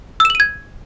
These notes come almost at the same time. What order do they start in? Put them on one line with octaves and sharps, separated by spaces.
E6 E7 F#7 D#7 G#6